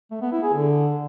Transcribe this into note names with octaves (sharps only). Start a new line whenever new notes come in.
A3
B3
E4
G#4
D3